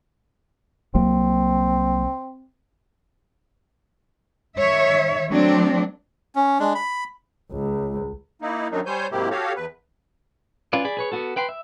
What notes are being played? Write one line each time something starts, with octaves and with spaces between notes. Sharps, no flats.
C2 F#3 A#3 C4
D#3 C#5 E5
F#3 A3 C4 D4
C#4
G#3 D4
B5
C#2
A#3 D#4 E4
F#2 D#3 F#3 D4 D#4
G3 C5 C#5 G#5 G6
G#2 C3 F#3 A#3 E4 G4
F#4 G4 A4 C#5 F5
E2 B4
C#4 F4 B4 D5
G#4 D5 B5
G#4 B4 C#5
B3 F#4 A4
B4 G5 B5 C6
E5